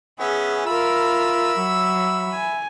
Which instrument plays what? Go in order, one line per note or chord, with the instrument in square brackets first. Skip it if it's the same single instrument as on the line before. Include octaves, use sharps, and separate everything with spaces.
[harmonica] B3 C#4 E5 [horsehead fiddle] G#4
[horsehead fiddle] F4 A#4 [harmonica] E5 B5 E6
[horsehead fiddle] F#3
G#5